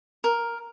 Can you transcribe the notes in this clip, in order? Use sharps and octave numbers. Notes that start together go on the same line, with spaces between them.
A#4